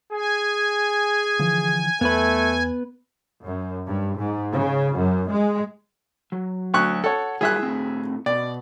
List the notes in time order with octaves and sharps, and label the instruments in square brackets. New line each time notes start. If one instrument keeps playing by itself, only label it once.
[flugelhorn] G#4 [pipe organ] G#5
[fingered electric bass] D3 E3 F3
[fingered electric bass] E2 [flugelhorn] A3 [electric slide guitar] B3 B4
[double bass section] F#2
G2
G#2
C#3
F#2
G#3
[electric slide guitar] F#3
[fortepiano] D2 C#6 F#6
[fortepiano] A4 C#5 [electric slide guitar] F#5
[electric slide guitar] F#3 G3 E4 [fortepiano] G#4 E5 F#6
[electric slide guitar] A2 C4
[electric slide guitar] B2 [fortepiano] D5